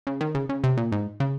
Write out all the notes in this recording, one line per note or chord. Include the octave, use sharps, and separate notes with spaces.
C#3
D#3
C#3
C#3
C3
A#2
G#2
C#3